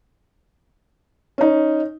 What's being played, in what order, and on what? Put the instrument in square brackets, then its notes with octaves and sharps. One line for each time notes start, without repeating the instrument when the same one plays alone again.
[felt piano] C#4 D#4